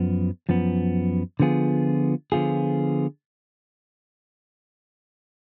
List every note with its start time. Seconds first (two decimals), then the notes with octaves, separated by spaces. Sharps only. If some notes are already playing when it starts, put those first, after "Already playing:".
Already playing: F#2 F3 B3
0.49 F#2 F3 B3
1.40 D3 F3 B3 F4 G#4
2.32 D3 F3 B3 F4 G#4